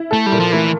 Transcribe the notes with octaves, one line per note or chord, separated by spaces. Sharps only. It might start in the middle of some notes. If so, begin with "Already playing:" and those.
Already playing: E4
A3 A4
G3
A#2
F3
E3 A3